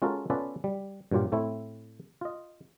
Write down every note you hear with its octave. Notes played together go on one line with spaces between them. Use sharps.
G#3 C#4 F4 F#4 A4 A#4
B3 C#4 F4 A4 B4 D5
G3
G2 A#2 F#3 F4 G4
A2 A3 C4 E4
F4 D#5